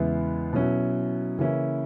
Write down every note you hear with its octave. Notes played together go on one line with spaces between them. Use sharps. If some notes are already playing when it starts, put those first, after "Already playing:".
Already playing: E2 C#3 G#3 B3 E4
B2 F#3 C#4 E4
C#3 E3 A#3 C#4 E4